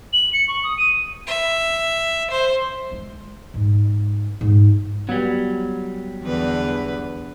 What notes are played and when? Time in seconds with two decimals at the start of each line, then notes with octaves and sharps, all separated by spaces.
0.13 F#7
0.33 C#7
0.48 C#6
0.63 D#6
0.78 D#7
1.27 E5
2.30 C5
2.92 G#3
3.54 G#2
4.41 G#2
5.09 F#3 G3 B3
6.23 E2 D3 B4